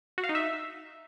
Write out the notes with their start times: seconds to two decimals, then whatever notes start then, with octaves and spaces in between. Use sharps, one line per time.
0.18 F#4
0.24 F5
0.29 D#4
0.35 E5